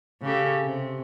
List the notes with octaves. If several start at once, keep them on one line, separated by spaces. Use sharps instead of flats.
C#3 G4 A4
C3